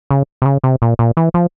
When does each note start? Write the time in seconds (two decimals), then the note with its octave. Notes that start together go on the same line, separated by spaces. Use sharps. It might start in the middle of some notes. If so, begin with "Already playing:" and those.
0.11 C#3
0.42 C3
0.46 C#3
0.64 C3
0.82 A#2
0.99 A#2
1.17 E3
1.34 F3